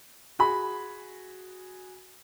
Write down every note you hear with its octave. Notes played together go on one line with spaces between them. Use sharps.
F#4 G#4 B5